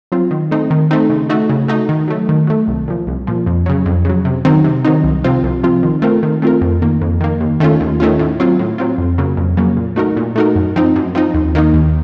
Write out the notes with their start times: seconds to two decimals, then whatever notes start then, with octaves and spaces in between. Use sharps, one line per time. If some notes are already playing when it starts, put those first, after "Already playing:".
0.12 F#3 C4 F4
0.31 D#3
0.51 A3 C4 D#4
0.70 D#3
0.91 A3 C4 D#4
1.10 C#3
1.30 A3 D#4 F#4
1.49 C#3
1.68 A3 D#4 F#4
1.89 D#3
2.08 F#3 A3
2.29 D#3
2.47 F#3 A3
2.68 C2
2.88 A#2 F3
3.07 C2
3.27 A#2 F3
3.46 F2
3.66 C#3 F#3
3.86 F2
4.05 C#3 F#3
4.25 C3
4.45 D#3 F#3 C4 D#4
4.64 C3
4.85 D#3 F#3 C4 D#4
5.04 C2
5.24 C3 F3 C4 F4
5.44 C2
5.63 C3 F3 C4 F4
5.83 D#3
6.02 A3 C4 F4 A#4
6.23 D#3
6.42 A3 C4 F4 A#4
6.61 F2
6.82 D#3 A#3
7.01 F2
7.21 D#3 A#3
7.40 D#2
7.60 D#3 A3 C#4 F4
7.80 D#2
8.00 D#3 A3 C#4 F4
8.19 A2
8.40 F#3 C4 F4
8.59 A2
8.78 F#3 C4 F4
8.98 F2
9.18 C#3 F#3 A#3
9.37 F2
9.57 C#3 F#3 A#3
9.77 A#2
9.96 A3 D#4 F#4 A#4
10.17 A#2
10.36 A3 D#4 F#4 A#4
10.55 F#2
10.76 F3 C4 D#4
10.96 F#2
11.15 F3 C4 D#4
11.34 D#2
11.55 D#3 A#3 D#4
11.74 D#2